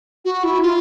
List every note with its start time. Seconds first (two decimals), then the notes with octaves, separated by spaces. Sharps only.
0.25 F#4
0.44 E4
0.62 F4